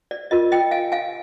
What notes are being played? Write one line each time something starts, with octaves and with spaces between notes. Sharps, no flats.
D5
F4 A#4 D#5
D#5 G5
F5 G#5
F5 G#5